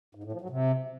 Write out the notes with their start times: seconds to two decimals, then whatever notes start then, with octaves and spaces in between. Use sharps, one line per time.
0.15 G#2
0.24 A2
0.32 F3
0.41 F#3
0.50 C3